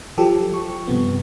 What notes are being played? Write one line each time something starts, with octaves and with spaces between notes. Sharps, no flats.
F3 F#3 G4 A4
F3 C#6
G2 C3 B3